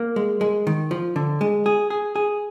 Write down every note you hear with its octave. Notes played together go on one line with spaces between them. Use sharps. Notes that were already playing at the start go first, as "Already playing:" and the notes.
Already playing: A#3
G#3
G#3
D#3
F3
D3
G#3
G#4
G#4
G#4